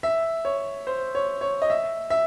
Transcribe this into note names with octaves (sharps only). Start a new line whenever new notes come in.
E5
C#5
C5
C#5
C#5
D#5
E5
E5